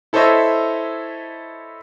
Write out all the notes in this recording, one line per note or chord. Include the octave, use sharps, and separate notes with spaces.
E4 A4 C5 C#5 D#5 E5